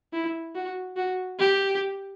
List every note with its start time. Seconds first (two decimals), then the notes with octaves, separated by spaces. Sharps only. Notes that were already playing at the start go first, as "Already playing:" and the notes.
0.13 E4
0.55 F#4
0.97 F#4
1.40 G4